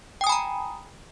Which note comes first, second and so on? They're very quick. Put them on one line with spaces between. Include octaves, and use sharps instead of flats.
G5 D#6 G#5 B5 A#5